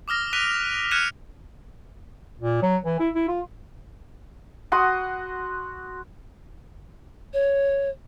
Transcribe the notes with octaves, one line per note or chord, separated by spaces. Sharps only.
D6 D#6 F6 A#6 G7
F#6 B6 D7 D#7 F7 G7
F6 F#6 G#6 C#7 D#7 E7
A#2
F#3
E3
E4
E4
F4
F#4 F#5 C6 D#6
C#5